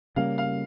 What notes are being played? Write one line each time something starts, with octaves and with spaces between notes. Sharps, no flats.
C#3 G3 A#3 C#4 F5
F5